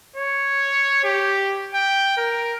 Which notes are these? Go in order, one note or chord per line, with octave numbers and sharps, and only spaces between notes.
C#5
G4
G5
A#4